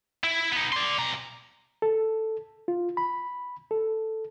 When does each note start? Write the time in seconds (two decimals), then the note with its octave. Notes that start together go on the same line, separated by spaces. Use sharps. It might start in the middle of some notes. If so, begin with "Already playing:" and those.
0.24 E4
0.52 B3 D#4
0.73 D5 C6
0.98 B2 A#5
1.82 A4
2.68 F4
2.97 B5
3.71 A4